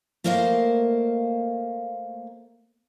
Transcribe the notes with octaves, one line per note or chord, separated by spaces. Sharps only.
A3 A#3 A#4 C5 D#5 F5